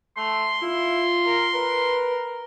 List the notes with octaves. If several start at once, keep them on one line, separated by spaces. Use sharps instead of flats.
A3 C6
E4 F4
A#4
A#4 B4